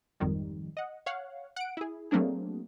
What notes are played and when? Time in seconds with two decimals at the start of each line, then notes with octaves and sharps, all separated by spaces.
0.20 G#1 F2 D#3 G3
0.77 D#5 F#5
1.06 C#5 F5 F#5
1.56 F#5 D7
1.77 E4 G#4
2.11 F#3 A3 A#3 C4 D4 G#4